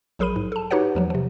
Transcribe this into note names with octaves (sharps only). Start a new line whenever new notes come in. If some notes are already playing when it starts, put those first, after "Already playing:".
A#1 F#3 G#4 A#4 B5 D#7
G#2
A4 A5
D#4 F#4 G4 B4 C#5 F#5
E2 F3 F#3
C3 F3